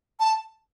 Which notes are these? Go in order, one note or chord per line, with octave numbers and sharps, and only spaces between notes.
A5